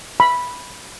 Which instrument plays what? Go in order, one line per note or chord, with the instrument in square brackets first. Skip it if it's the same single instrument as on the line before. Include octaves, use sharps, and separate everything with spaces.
[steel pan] B5